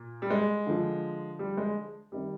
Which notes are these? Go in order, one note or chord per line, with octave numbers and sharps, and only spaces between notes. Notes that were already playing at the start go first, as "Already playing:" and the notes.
Already playing: A#2
G3
G#3
D3 F3
G3
G#3
C3 D#3 G3